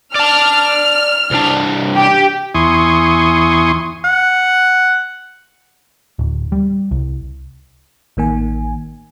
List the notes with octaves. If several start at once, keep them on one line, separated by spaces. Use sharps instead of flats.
D5 A5 F6
C2 D4
G4
E2 E4 G#5 C6 C#6 D#6
F#5
D1
G3
C2
A1 D#3 A#3 G#5